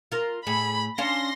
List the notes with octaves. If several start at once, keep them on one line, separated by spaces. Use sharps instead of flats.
F4 A#4
A2 G#4 B5
C#4 D4 F5 C6 A#6